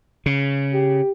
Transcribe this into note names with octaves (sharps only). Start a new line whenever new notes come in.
C#3
G4